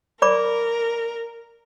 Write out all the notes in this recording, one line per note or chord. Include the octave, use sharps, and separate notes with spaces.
A#4 D5 B5 D6